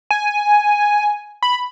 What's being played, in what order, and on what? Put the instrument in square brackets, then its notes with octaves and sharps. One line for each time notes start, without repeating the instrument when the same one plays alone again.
[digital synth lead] G#5
B5